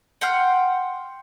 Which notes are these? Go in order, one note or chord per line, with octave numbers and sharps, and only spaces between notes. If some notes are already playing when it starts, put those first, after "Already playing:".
F#5 G5 C6 F6